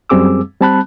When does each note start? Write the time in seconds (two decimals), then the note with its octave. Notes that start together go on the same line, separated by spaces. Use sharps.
0.09 F#2 G3 C4 G#4 D6 E6
0.60 G3 C4 A5 B5 F#6